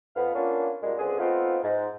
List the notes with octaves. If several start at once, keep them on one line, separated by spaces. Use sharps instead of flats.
F2 B3 F5
A#3 B3 C#4 D4 F4
F#2 A#2 G3 G#3
C#2 D3 C4 G#4
A3 B3 C4 D#4 F4
G#2